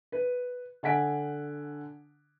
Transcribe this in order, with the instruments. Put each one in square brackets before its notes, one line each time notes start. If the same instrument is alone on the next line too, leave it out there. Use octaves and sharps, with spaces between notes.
[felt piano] B4
D3 F#5 G#5 B6 D7